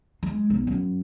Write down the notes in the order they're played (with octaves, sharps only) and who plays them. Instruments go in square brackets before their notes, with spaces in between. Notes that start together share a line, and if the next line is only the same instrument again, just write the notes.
[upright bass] G#3
B1
F#2